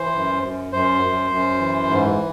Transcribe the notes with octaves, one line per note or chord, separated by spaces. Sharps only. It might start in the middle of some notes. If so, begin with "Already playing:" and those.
Already playing: E3 C5
F#2
F#2
F#2 C5
F#2
F#2
E3
G#2